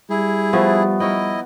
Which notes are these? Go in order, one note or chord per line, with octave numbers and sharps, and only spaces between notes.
G3 E4 G#4
F3 A3 B3
E4 A#4 C#5 D#5 G5